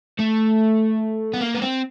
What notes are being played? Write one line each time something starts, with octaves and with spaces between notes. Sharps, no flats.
A3
B3
A#3
B3
C4